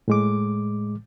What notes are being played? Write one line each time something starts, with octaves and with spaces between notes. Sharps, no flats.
A2 G#3 D6